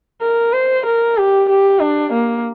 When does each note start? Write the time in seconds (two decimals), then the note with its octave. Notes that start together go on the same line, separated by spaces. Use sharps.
0.22 A#4
0.53 C5
0.86 A#4
1.17 G4
1.49 G4
1.81 D4
2.13 A#3